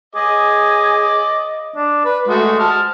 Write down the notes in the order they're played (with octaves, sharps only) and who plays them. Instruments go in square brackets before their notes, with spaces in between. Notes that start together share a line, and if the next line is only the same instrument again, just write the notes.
[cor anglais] G#4 [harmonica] D#5 D6
[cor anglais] D4
B4
[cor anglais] G#3 [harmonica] A3 F#4
[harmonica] A5 F6